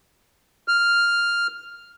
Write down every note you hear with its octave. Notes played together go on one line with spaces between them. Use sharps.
F6